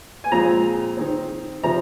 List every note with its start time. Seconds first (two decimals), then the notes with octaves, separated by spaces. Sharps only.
0.24 G#5
0.32 A#2 F3 G#3 C4 A#5
0.97 D#3 C4
1.63 C3 F3 C4 A#5